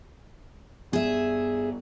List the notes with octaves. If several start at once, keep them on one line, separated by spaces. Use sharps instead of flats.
G2 B3 G#4 E5